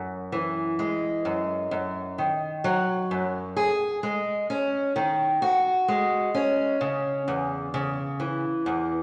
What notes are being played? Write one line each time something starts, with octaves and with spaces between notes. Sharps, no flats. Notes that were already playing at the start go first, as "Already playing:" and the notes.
Already playing: F#2
E3
G#3
F#2
F#2
D#3
F#3
F#2
G#4
G#3
C#4
D#3
F#4
G#3
C#4
C#3
E2
C#3
E3
E2